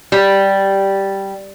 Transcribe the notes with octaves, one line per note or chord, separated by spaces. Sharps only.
G3